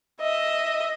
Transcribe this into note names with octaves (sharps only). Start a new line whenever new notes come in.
D#5 E5